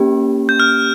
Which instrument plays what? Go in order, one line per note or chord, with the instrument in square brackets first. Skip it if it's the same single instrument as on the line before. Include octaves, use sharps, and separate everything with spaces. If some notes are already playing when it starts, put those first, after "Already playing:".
Already playing: [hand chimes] A#3 C#4 G4
[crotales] G6
F6